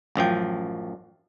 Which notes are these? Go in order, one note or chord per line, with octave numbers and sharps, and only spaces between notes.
A1 F#2 F3 G5